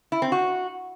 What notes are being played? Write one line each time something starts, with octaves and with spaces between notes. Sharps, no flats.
E4
C4
F#4